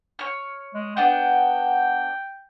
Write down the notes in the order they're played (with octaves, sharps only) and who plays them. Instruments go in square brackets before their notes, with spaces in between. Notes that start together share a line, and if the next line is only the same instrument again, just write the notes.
[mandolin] C#5 F6
[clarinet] G#3
[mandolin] B3 D4 F#5 [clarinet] G5